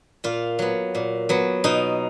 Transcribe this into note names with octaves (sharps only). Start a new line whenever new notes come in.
A#2 F4
F#3 B3
A#2
F#3 B3
B2 D#4